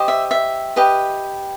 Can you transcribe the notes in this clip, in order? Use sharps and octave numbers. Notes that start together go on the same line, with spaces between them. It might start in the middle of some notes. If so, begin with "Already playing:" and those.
Already playing: G4 C5 D#5
E5
E5
G4 B4 D#5